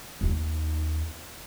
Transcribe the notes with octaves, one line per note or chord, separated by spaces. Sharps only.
D#2 D#4